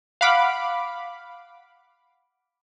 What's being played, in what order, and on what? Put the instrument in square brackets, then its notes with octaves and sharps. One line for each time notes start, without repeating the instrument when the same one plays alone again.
[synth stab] F5 F#5 B5 D6